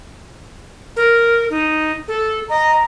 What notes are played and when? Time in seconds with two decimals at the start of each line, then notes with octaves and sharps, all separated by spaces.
0.96 A#4
1.50 D#4
2.08 A4
2.50 D#5 A#5